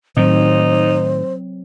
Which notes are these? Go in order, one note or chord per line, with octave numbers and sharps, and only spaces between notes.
A2 D#3 F#3 C4 D#4 C5